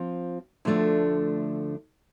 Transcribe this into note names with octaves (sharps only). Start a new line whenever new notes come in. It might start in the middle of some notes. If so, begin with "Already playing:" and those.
Already playing: F3 C4 F4
D2 D3 F3 A3 D4